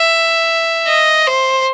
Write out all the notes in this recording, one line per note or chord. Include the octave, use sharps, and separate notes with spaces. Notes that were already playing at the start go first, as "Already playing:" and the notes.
Already playing: E5
D#5
C5